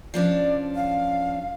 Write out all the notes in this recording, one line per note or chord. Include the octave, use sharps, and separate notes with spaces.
F3 C#4 D4 D5
F5